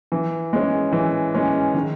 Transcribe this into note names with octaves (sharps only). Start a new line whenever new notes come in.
E3
G#3 C#4
E3
G#3 C#4
D#3